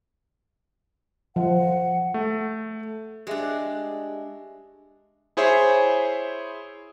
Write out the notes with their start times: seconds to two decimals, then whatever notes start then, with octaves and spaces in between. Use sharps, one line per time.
1.36 F3 F#5
2.14 A3
3.27 G#3 D4 G4 G#4 E5
5.37 E4 G#4 C5 C#5 E5